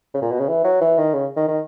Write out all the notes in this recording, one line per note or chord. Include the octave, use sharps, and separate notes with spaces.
C#3
A#2
B2
C#3
E3
F#3
E3
D#3
C#3
D#3
D#3